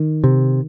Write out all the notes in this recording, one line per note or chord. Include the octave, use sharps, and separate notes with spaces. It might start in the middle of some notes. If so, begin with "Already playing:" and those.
Already playing: D#3
C3